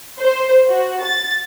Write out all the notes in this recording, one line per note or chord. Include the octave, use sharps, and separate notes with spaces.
C5
F#4
A6